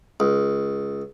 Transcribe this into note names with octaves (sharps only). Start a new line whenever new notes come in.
C#2